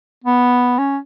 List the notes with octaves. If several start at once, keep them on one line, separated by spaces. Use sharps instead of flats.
B3
C#4